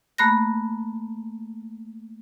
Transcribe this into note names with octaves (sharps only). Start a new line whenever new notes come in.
A3 A#3 B5 F#6 A#6